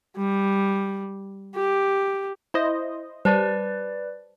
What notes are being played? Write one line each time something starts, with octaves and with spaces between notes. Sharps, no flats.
G3
G4
E4 C5 D#5
G3 B4 C5 D5 A5